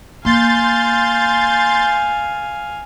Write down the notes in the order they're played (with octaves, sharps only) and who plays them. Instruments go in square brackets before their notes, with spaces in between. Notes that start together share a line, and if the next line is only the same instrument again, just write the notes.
[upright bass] A#3 [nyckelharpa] F5 G#5 [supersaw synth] C6 G6 A6